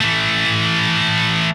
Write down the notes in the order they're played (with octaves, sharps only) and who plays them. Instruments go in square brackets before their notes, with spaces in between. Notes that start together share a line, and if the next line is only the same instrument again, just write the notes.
[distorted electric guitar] E3 A3